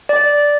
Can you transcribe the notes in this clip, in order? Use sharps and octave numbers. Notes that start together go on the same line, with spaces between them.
D5